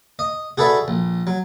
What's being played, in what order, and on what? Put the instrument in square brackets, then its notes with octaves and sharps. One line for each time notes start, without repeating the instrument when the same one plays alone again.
[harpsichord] D#5
F#4 G#4 A4 B4 D5 E5
A#1
F#3